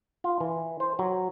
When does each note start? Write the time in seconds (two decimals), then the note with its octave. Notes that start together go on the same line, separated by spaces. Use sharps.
0.24 F4
0.40 E3
0.80 C5
0.99 F#3